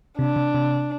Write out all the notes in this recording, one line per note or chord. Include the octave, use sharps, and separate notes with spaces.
C3 D4
C3
C3